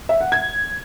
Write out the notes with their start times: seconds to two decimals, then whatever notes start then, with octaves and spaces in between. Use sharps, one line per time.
0.09 E5
0.21 F#5
0.32 G#6